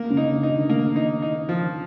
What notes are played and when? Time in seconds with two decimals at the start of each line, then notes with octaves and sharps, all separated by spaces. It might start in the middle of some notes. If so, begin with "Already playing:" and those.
Already playing: A#3
0.10 C#3
0.17 D#4
0.30 D3
0.43 D#4
0.50 D#3
0.69 A#3
0.96 D#4
1.22 D#4
1.49 F3